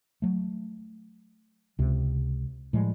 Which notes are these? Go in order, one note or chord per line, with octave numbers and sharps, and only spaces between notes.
F#3 A3
C#2 C3
A2 F3 G3 G#3